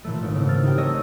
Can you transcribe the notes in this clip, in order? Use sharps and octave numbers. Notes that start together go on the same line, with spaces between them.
A#2 E3 A3
G#1
C#3 C4 E4
F6 A6
D#4 G4 G5
A3 C#5 D#5 E6 A#6